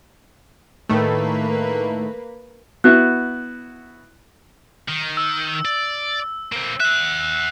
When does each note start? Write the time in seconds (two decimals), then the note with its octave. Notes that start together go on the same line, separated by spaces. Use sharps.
0.89 A2 D#3 A3 A#3 B4
2.84 B3 E4 F#4 F#6
4.88 D#3
5.17 E6
5.65 D5
6.52 A#3 C4
6.80 E5 F#5 F#6